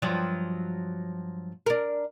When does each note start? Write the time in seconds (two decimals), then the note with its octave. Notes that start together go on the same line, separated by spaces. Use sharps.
0.02 G2 F3 F#3
1.66 D4 A#4